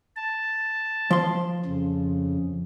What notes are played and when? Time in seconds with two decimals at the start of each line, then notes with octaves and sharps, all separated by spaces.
0.16 A5
1.11 F3 C6
1.66 F2 C#3